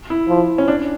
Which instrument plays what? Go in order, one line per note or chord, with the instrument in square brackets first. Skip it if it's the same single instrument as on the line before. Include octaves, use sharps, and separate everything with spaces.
[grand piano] E4
[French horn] F3
[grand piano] C#4
D4